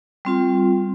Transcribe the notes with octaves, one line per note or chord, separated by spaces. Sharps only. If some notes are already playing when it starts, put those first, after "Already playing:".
G3 C4 F4